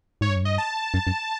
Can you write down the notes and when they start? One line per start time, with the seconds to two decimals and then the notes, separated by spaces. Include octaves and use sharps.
0.21 G#2 C#5
0.29 G2
0.36 F#2
0.43 G2 D#5
0.58 A5
0.94 F#2
1.07 F#2